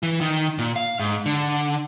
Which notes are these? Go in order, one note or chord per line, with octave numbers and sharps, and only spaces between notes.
E3
D#3
A#2
F5
G#2
D3